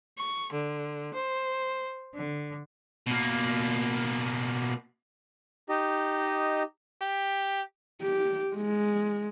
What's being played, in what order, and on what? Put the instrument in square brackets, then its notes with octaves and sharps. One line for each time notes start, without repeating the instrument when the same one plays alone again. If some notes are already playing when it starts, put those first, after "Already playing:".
[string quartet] C#6
D3
C5
D3
[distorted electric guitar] B2 A#3
[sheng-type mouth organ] D#4 G4 D#5
[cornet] G4
[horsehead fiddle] G4
G#3